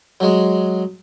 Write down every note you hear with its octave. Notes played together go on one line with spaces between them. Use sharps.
F#3 G#3